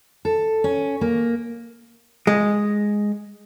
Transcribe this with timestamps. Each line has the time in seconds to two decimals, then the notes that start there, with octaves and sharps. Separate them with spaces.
0.25 A4
0.64 C#4
1.01 A#3
2.27 G#3